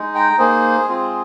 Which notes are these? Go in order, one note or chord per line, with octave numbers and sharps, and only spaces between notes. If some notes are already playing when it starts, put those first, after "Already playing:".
Already playing: G#3 D#4
G5 A#5
A#3 D#4 G#4 C5
G#3 C4 F4